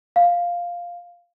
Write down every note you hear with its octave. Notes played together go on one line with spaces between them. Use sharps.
F5